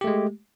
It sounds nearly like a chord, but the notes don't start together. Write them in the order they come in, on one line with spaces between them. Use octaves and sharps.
G4 A3 G#3